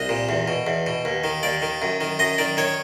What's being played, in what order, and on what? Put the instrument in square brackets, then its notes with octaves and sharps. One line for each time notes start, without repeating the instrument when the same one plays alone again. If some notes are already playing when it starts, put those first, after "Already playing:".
Already playing: [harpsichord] C2 D#5
A#2
E2
B2
E2
B2
D#2
D#3
D#2 D5
D#3
F#2
D#3
F#2 D#5
D#3 D5
D#3 C#5